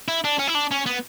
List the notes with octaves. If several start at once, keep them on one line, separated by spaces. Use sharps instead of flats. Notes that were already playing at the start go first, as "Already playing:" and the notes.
E4
D4
C#4
E4
D4
C#4
B3